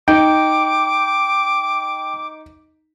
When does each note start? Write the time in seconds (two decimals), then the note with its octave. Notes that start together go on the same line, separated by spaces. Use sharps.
0.08 D#4 G5 D6